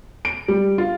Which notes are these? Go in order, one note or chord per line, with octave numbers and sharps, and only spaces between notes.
D7
G3
F4